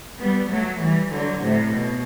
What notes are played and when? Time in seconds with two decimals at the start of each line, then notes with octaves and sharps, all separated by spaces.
0.21 G3 B3
0.52 F#3 A3
0.82 E3 G3
1.14 D3 F#3
1.44 A2 C3
1.75 B2